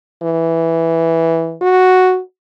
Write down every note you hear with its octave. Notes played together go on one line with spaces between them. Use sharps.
E3
F#4